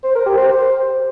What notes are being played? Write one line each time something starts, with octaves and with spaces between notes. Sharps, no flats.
C5
A#4
G4
C5
C5